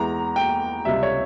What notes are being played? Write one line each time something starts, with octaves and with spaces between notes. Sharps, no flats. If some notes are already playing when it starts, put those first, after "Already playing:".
Already playing: E2 E3 G#3 A#5
G5
C#2 C3 G3 E5
C#5